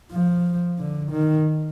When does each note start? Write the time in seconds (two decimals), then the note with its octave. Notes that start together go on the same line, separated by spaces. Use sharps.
0.12 F3
0.78 D3
1.12 D#3